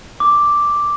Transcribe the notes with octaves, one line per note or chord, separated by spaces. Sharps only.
D6